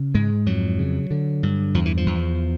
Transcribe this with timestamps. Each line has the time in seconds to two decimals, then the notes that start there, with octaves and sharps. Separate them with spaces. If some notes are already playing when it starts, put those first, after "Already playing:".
Already playing: C#3
0.14 G#2 G#3
0.46 F2 F#3
0.79 C#3
1.11 D3
1.43 G2
1.74 E2 F3
1.86 E3
1.97 F3
2.06 E2